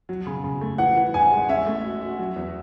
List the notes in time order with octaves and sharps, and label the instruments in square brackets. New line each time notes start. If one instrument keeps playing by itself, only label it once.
[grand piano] F#3
C#3
C#3
A3
[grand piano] E3 [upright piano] F#5
[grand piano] E3
[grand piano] A1 [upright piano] G#5
[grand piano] G#3
[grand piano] C#4 [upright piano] E5
[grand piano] A3
F#4
F#4
F#3
E2